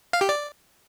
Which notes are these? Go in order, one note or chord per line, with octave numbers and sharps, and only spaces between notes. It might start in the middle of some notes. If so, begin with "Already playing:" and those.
F5
G4
D5